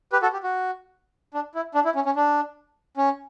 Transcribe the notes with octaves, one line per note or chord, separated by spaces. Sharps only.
G4 B4
F#4 A4
G4
F#4
D4
E4
D4
E4
C#4
C#4
D4
C#4